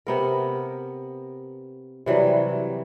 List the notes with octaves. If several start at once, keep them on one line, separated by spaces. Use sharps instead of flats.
C3 B3 A#4
C3 E3 F#3 G3